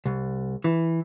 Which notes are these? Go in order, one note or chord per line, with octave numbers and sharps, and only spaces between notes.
C2
E3